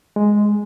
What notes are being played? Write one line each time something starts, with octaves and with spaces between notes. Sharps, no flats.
G#3